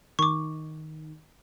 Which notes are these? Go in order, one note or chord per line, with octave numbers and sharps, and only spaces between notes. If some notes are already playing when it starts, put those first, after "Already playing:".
D#3 C#6 D6